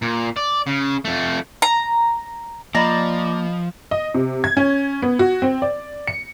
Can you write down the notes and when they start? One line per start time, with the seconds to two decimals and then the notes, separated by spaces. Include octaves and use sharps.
0.02 A#2
0.37 D5
0.67 C#3
1.05 F2 A3
1.62 A#5
2.75 F3 A#3 D5 D#5 A#5 B5
3.91 D#5
4.15 C3
4.44 G#6
4.57 C#4
5.02 B3
5.19 F#4
5.42 C4
5.62 D5
6.07 C#7